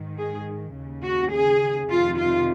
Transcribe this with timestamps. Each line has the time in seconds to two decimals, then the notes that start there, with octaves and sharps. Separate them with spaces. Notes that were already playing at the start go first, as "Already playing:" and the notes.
Already playing: G#2 D#3
0.18 G#4
0.75 D#2 C#3
1.03 F#4
1.33 G#4
1.90 F2 C3 D#3 F4
2.18 F4